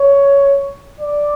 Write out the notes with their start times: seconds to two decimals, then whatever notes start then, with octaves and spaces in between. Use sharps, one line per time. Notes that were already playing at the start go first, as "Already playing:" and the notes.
Already playing: C#5
1.00 D5